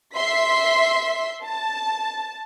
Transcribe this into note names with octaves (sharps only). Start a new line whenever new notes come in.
E5 C6 B6
A5